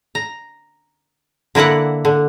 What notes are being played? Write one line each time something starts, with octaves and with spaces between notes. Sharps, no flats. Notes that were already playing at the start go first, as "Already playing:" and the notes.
A#5
D3 A#3 E4 D5 F#5
D3